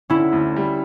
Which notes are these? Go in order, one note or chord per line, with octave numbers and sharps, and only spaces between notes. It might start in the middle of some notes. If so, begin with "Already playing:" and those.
D3 C#4 E4
D2
G3